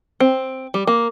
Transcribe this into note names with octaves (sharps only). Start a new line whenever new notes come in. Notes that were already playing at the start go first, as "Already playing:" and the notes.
C4
G3
A#3